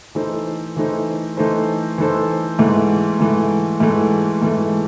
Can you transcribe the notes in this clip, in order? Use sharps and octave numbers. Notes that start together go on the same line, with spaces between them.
E3 A3 D#4 A4 C5
E3 A3 D#4 A4 C5
E3 A3 D#4 A4 C5
E3 A3 D#4 A4 C5
G#2 E3 A3
G#2 E3 A3
G#2 E3 A3
G#2 E3 A3